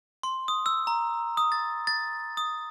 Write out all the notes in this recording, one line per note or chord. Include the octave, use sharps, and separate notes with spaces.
C6
D#6
E6
A#5
D#6
A6
A6
D#6